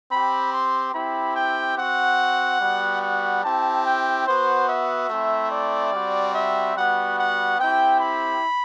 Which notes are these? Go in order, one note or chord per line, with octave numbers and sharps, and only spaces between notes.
C4 G4 B5
C6
C4 E4 G4 B5
G5
C4 F#4 F#5
G3 B3 F#4
F#5
C4 E4 G4 A5
G5
B3 F#4 C5
E5
A3 C4 E4
D5
G3 C4 F#4
E5
G3 B3 F#4 F#5
F#5
C4 E4 G4 G5
B5